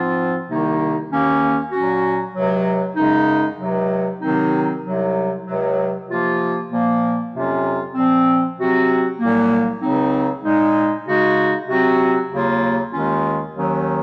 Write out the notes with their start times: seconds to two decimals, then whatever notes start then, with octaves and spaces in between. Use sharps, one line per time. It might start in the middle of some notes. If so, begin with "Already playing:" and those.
Already playing: G#2 F3 C4 F4
0.48 C2 C3 D#3 A#3 D#4
1.09 D#2 D#3 A#3 C#4
1.71 A#2 F#3 C#4 F#4
2.34 C#2 C3 F#3
2.96 F#2 C#3 G#3 D#4
3.59 C#2 C3 F#3
4.22 C3 D#3 F#3 C4 D#4
4.84 C2 C3 F#3
5.45 C#2 C3 F#3
6.08 C3 F3 A#3 F4
6.71 A#2 F3 A#3
7.33 F2 C3 F#3 C#4 F4
7.95 A#2 F3 C4
8.57 C3 F#3 C4 F#4
9.20 C2 A#2 F#3 A#3
9.81 C#2 C#3 F#3 C4 D#4
10.44 A#2 G#3 D#4
11.06 C#3 G#3 D#4 F#4
11.68 C3 F#3 C4 F#4
12.31 D#2 C#3 F#3 A#3 F4
12.93 D#2 D#3 G#3 C#4 F4
13.55 D#2 D#3 F#3 C#4